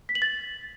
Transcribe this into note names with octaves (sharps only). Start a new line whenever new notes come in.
B6
F#7
A6